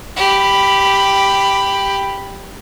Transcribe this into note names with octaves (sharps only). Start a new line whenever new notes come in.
G4 B5